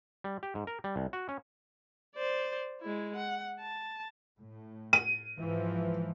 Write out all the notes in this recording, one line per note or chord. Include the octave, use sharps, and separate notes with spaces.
G3
G4
G#2
A#4
G3
C2
F#4
C#4
C5 D5
G#3 E4
F#5
A5
A2
D#7
G#2 E3 F3